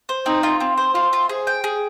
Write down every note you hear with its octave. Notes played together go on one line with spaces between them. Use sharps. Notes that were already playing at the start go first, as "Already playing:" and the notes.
C5
C4 D#4
F4
C4
C5
C4 F4
F4
G#4 C5
G5
G#4